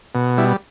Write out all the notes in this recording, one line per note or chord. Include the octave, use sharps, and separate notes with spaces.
B2
G3 E4